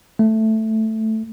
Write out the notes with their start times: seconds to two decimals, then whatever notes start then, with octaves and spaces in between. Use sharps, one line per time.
0.19 A3